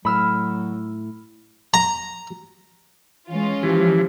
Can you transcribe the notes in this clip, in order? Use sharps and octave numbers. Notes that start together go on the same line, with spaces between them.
A2 F#3 B5 E6 F6
A#5
E3 G#3 C#4 F4
E3 F3 G4